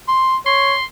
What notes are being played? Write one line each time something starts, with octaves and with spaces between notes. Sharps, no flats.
C6
C#5 C6